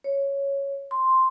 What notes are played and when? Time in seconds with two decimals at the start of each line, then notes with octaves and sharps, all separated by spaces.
0.04 C#5
0.91 C6